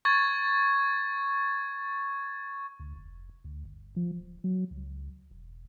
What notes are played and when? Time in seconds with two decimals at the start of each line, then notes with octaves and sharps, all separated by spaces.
0.05 C#6 G#6 A6
2.80 D2
2.95 F1
3.44 D2
3.65 G1
3.96 F3
4.16 D1
4.44 F#3
4.71 C#2
5.31 E1